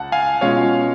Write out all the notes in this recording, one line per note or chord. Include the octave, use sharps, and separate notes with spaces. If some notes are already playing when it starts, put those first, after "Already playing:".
Already playing: C#2 F#5 A5
F5 G#5
B2 G#3 C#4 F4 C#5 F5